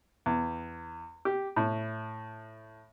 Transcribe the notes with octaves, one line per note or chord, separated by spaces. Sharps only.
E2
G4
A2